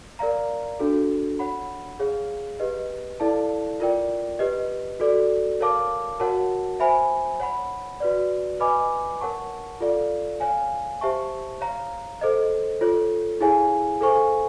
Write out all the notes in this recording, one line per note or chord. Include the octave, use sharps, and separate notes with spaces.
A#4 D5 F5 A#5
D4 F#4 A4
C#5 F#5 B5
G#4 C#5 F5
G4 B4 D#5
E4 A4 D5 F5 A5
F4 A#4 D5 G5
G4 B4 D#5
F#4 A4 D5
A#4 C#5 F5 A5 D6
F#4 A#4 C#5 F#5 A5
C5 E5 G#5 B5
C#5 F#5 B5
F#4 B4 D5
B4 D#5 G#5 B5 D6
A#4 C#5 F#5 A5 C#6
F4 A4 D5 F5
C#5 F5 G#5
G4 C5 E5 A5 C#6
C#5 F5 A#5
A4 C5 D#5
F4 A4 C#5
E4 G#4 C#5 F5 G#5
A4 C5 F5 G#5 C#6